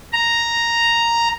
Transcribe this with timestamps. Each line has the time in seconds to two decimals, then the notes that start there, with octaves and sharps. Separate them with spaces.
0.13 A#5